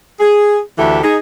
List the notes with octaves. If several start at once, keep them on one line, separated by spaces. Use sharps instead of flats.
G#4
D2 D3 E3 G4 A4 E5
D#4 G#4